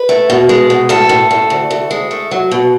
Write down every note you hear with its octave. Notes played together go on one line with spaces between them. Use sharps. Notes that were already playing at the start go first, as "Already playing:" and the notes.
Already playing: B4
A3
B2
G#3
B2
A2 A4
A2
A2
D2
D2
G#3
A3
F#3
B2